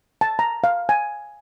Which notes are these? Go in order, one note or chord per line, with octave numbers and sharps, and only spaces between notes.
A5
A#5
F5
G#5